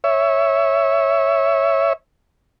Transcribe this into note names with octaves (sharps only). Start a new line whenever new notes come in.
C#5 E5